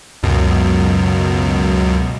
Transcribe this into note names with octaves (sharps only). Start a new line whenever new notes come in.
C#2 F#2 B2